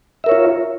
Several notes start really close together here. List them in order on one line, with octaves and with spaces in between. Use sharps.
E5 A#4 C#5 F4